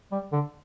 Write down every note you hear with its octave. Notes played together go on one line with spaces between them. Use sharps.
G3
D3